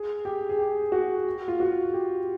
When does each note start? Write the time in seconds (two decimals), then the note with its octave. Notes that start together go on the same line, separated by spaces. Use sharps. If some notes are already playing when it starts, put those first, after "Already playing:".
Already playing: G#4
0.25 G4
0.49 G#4
0.59 G4
0.92 F#4
1.48 F4
1.60 F#4
1.93 G4